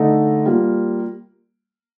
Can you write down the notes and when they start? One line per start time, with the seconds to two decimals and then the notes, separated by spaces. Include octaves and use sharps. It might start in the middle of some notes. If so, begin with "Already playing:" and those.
Already playing: D3 A3 D#4
0.46 G3 A#3 F4